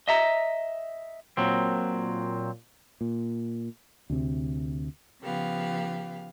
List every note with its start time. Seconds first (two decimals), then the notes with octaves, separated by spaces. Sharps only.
0.08 D#5 E5 A#5
1.37 A#2 F#3 C4
3.01 A#2
4.10 D2 C3
5.23 C#3 F3 B3 G4 F5